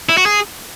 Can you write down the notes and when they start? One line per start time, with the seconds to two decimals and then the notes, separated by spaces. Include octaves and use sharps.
0.09 E4
0.17 F#4
0.26 G#4